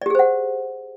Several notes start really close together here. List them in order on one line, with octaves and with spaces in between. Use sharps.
D5 G4 G#4 C5 F#5